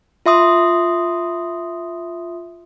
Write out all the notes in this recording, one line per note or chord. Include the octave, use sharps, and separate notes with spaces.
F4 E5 C6 D#6